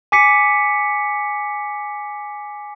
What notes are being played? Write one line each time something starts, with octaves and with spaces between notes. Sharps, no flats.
G#5 D6 B6 C#7